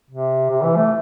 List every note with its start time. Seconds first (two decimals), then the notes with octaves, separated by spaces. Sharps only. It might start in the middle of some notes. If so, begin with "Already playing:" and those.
0.11 C3
0.50 C3
0.63 E3
0.76 A3